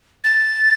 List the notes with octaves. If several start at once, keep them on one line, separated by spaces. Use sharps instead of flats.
A6